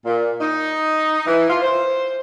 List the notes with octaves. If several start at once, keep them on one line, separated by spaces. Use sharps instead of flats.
A#2
D#4
E3
F4
C5